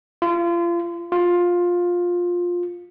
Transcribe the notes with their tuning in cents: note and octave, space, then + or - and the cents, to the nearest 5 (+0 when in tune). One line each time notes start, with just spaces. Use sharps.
F4 -30
F4 +15